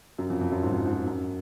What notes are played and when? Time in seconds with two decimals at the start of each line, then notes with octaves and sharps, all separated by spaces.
0.19 F#2
0.30 F2
0.41 F2
0.52 F#2
0.63 G#2
0.71 F2
0.77 F#2
0.86 G#2
0.91 F#2
1.06 F#2